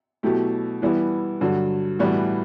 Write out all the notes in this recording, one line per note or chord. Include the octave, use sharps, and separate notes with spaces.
B2 F#3 A3 E4 G4
E3 G3 B3 E4
G2 D3 F#3
A2 E3 G3 B3 F#4